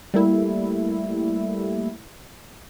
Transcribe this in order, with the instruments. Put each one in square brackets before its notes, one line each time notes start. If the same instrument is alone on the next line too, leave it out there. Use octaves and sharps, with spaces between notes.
[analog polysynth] G3 A3 A#3 E4